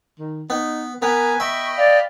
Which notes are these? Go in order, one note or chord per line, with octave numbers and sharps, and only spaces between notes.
D#3
B3 D#4
B3 A#4 B4 G#5
B3 D#5 E5 G5 B5 C#6
D5 F5